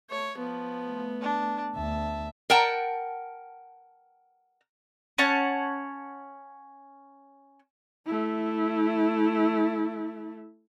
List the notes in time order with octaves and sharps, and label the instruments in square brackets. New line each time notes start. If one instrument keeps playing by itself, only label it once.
[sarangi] A3 [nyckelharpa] C#5
[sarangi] F3 [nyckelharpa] B3
[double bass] A3
[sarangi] D4
[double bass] D2 [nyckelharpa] E5 [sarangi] A5
[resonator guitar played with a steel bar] A#4 F#5 G5 A5
[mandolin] C#4 C#5 F#5 A5
[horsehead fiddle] A3 E4